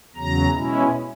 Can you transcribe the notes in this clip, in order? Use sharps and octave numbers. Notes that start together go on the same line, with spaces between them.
E2 C#3 F#3 A#5
B2 G#3 C#4 E4